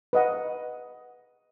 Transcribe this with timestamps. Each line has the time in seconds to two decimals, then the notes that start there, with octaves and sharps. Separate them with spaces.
0.13 B4 D#5 F#5